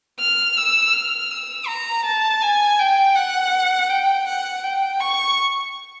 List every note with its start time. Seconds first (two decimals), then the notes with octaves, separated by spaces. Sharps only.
0.20 F6
0.57 E6
0.93 F6
1.31 E6
1.67 A#5
2.05 A5
2.42 G#5
2.79 G5
3.16 F#5
3.90 G5
4.27 F#5
4.63 G5
5.01 C#6